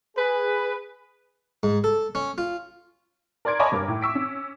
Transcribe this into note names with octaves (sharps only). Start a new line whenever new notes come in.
G#4 B4
G#2
A4
C#4
F4
A#4 D5 C6 G#6 D7
C#5 D#5 G#5 A5 B5 D6
G2 A#4 D6
A2
C#6 E6 B6 D7
C#4